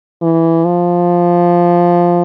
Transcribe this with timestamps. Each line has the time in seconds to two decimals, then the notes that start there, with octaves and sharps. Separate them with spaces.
0.22 E3
0.65 F3